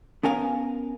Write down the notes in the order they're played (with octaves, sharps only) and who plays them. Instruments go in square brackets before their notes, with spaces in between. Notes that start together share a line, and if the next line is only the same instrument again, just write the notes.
[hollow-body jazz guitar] B3 C#4 A#4 F5 G#5